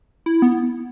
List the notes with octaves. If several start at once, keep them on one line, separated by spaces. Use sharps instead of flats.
E4
B3